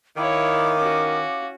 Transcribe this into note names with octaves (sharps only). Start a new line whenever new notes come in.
D#3 E4 C#5 F5 D6
C#4 F#4